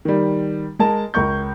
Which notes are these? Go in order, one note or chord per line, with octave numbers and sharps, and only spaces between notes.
D#3 G3
G#3 A#4 A5
C#2 A#4 C#6 G6